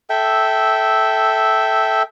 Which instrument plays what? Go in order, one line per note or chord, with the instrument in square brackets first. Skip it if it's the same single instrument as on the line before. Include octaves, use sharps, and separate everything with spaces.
[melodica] A4 E5 G5